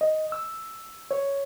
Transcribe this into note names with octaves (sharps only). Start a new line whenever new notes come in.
D#5
E6
C#5